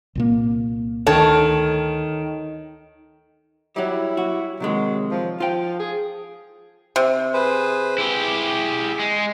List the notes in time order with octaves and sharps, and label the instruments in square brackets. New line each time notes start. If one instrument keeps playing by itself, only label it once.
[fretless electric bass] C2 A#2 A#3
[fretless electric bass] D2 D3 [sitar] D#3 [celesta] A4 [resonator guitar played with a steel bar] C#5 A5
[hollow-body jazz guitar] F#3 G3 [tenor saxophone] E4
[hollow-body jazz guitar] F#4
[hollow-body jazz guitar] C3 D#3 G#3 [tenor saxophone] F#3
[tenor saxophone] F3
[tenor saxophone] F3 [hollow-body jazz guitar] F4 G5
[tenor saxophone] G#4
[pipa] C3
[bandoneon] G#4 B4 C5
[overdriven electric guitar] E4 G4 [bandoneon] G#4
[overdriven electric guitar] G#3